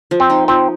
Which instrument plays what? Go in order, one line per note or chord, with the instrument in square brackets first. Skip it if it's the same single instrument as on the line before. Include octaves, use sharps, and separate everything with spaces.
[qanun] F3
[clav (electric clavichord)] C4
[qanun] D#4
[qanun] F3 [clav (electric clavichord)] C4